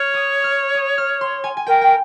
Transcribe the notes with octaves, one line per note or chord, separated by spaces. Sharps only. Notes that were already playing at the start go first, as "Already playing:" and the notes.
Already playing: C#5 F6
D#6
F6
D#6
F6
C6
G#5
G#5
A#4 G5
G5